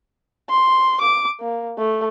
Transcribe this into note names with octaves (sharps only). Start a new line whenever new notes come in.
C6
D6
A#3
A3